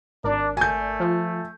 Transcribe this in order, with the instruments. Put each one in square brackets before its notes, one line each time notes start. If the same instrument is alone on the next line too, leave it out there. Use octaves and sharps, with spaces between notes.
[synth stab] G#1 A#4 D5 [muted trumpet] D4
[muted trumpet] A3 [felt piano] G#5 G6
[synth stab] F3